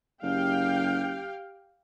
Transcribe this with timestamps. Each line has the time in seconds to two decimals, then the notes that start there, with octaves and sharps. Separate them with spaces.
0.23 F#1 G4 F5 G5